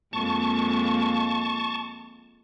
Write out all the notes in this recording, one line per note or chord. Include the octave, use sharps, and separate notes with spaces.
F2 G#3 A#3 A5 C#6